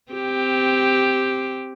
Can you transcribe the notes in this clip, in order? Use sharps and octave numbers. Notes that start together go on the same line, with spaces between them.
C4 G4